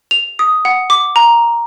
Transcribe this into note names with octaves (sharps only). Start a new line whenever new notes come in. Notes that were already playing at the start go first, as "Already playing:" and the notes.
F7
D#6
F#5
D6
A#5